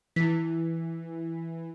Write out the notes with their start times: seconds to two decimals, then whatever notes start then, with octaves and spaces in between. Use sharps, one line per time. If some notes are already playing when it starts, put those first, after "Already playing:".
0.16 E3 E4 B6